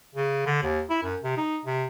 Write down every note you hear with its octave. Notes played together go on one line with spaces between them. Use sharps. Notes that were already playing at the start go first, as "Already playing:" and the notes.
C#3
D3
D#2
E4
F#2
C3
D#4
C3